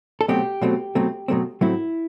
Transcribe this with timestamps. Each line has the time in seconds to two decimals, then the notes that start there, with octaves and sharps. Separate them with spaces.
0.21 A4
0.28 B2 F#3 A3 C4 G4
0.61 B2 F#3 A3 C4
0.95 B2 F#3 A3 C4
1.28 B2 F#3 A3 C4
1.61 A2 F#3 A3 C4 E4